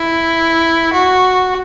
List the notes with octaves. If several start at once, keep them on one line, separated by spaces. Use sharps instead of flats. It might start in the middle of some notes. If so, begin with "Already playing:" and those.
Already playing: E4
F#4